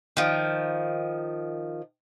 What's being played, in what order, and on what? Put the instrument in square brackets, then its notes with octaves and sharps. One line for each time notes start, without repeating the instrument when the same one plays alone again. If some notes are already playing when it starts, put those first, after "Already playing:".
[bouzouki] D#3 F3